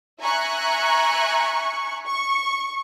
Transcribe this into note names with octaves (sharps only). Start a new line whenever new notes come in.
E5 G#5 A#5 C#6 F#6
C#6